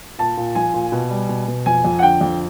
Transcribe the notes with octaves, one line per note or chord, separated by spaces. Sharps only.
A#2 A5
A#2
F3 G#5
A#2
B2
G3
B2
B2
F2 G#5
F2
F#5
D3 G5
F2